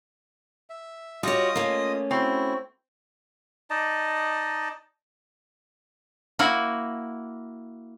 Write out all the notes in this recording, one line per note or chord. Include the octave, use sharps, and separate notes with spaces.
E5
G3 F4 F#4 C#5 D#5 D#6
A3 A#3 C#4
C4 E4 F#4
D#4 D5 D#5 A5
A#3 E4 F#4